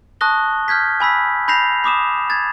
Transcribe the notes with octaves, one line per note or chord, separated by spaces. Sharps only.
A5 C#6 D#6 F#6 A#6 G7
F6 G6 G#6 B6
G#5 B5 E6 B6
B5 G6 A#6 C7 F7
B5 D6 D#6 E7
G#6 A6